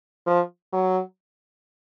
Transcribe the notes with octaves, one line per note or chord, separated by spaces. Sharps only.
F3
F#3